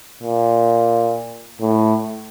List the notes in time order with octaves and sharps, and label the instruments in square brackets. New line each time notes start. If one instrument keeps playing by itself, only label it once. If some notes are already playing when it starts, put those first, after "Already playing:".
[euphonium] A#2
A2